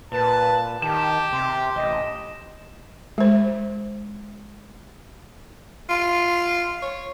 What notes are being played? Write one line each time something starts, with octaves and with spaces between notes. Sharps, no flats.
A#2 B4 A5
D#3 G4 A5 E7
C3 C6
A1 D#5
G#3 C5
F4
C#5